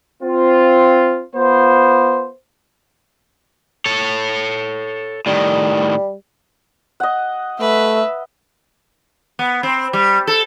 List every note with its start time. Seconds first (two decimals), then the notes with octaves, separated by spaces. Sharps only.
0.22 C4 F4
1.36 B3 F4 C5
3.86 A4 C#5
5.26 A2 D#3 G3
7.00 D#5 F#5
7.60 A3 B4 E5
9.39 B3
9.63 C4
9.93 G3
10.27 A4